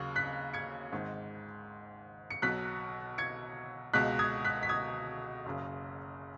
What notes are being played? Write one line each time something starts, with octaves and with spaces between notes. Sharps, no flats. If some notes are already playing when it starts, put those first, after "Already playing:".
Already playing: D#2 C#3 F#3
F#6 B6
G#6 C#7
G#1 G#2 D#3
C#7
B1 B2 F#3 F#6 B6
G#6 C#7
C#2 B2 G#3 F#6 B6
D#6 G#6
F#6 B6
B6
D#6 G#6
F#1 F#2 C#3